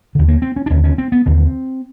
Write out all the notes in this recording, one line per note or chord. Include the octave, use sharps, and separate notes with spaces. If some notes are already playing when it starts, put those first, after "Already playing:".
D#2 D3
A#3
C4
C#4
D4
D#2 D3 C#4
C#4
C4
B3
D#2 D3 C4